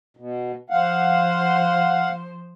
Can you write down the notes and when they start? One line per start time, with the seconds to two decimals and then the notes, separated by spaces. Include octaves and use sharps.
0.17 B2
0.70 F3 C5 F5 F#5